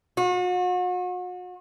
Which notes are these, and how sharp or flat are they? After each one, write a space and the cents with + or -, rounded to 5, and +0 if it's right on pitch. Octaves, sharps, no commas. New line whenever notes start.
F#4 -40